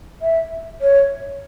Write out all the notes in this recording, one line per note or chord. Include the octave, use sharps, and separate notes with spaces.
E5
C#5